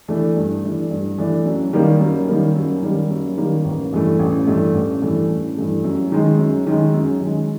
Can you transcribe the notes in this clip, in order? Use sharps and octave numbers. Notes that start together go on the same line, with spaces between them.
E3 A3 D4
G2
E3 A3 D4
G2
E3 A3 D4
F#2
D#3 G3 A#3
F#2
D#3 G3 A#3
F#2
D#3 G3 A#3
F#2
D#3 G3 A#3
A1
G2 E3 A3
A1
G2 E3 A3
A1
G2 E3 A3
A1
G2 E3 A3
F#2
D#3 G#3
F#2
D#3 G#3
F#2
D#3 G#3